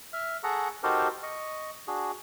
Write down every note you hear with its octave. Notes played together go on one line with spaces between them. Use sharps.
E5 F6
G#4 A4 F#5 A#5 C#6
D#4 F#4 G4 A4 A#4 C5
D#5 C#6
D4 F#4 G#4